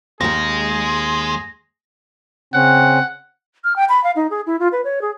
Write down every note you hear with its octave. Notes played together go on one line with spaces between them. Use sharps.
D#2 D#3 G#3 G#4 A#6
C#3 C4 C#4 F#5
F6
G5
B5
F5
D#4
G#4
E4
F4
B4
C#5
G#4